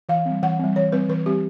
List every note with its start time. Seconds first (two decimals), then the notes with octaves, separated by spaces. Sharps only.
0.09 E3 F5
0.26 G3 C4
0.42 E3 F#5
0.59 G3 C4
0.76 E3 C#5
0.92 G3 C4 B4
1.09 E3 B4
1.26 G3 C4 G4